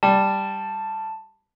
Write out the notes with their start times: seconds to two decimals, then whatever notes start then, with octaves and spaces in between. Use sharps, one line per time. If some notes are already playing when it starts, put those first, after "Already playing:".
0.03 G3 A5